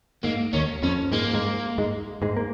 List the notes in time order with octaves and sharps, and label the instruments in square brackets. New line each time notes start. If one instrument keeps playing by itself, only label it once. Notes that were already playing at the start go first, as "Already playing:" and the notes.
[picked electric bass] G#2 [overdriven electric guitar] A#3
[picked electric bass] D#2 D#3 [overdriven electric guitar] C#4
[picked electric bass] F2 F3 [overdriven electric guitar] C#4
[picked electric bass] G#2 G#3 [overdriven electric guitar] A#3
[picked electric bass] G#2 G#3
G#2 G#3
G#2 G#3
A#3